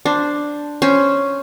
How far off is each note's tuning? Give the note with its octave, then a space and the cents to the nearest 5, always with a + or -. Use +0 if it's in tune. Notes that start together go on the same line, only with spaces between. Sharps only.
D4 +0 C5 +0
C#4 +0 C5 +0